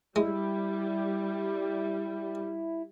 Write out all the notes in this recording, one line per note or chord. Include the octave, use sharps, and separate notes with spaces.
G3 G#3 E4